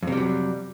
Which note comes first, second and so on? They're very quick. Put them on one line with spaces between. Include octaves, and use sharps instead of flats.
F2 C3 G3 F#3